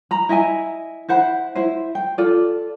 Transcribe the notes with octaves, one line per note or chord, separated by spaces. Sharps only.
A#5 B5
E4 D#5 E5 G#5
E4 C5 F#5 B5
E4 C5
G5
F4 A4 D5